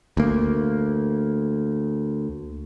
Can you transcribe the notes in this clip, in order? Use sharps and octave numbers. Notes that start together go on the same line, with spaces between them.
D2 A#3